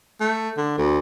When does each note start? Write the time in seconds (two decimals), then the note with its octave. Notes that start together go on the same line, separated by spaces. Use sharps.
0.21 A3
0.57 D3
0.78 D2